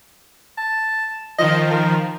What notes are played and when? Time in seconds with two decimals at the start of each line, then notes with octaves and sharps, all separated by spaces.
0.58 A5
1.39 D#3 F3 D#5
1.71 A#4